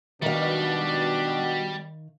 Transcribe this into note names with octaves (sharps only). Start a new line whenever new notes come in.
B2 D#3 G3 D4 F5